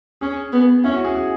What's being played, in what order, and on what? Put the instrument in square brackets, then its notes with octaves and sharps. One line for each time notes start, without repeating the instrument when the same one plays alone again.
[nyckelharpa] C#4 [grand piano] G#4
[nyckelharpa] B3
[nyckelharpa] C#4 [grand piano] E4
[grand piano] F#4
G#4
G#4